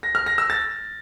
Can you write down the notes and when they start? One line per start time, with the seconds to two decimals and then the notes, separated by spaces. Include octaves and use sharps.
0.03 A#6
0.15 F6
0.26 A#6
0.38 E6
0.50 A6